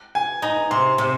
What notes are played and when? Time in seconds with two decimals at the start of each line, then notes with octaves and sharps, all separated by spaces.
0.15 G#5
0.42 D#4 A#5
0.71 C3 C6
0.98 C3